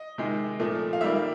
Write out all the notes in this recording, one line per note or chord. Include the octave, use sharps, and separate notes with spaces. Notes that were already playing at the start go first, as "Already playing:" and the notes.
Already playing: D#5
C3 D#3 G#3
A#2 F3 A3
F5
D#3 G3 A#3 E5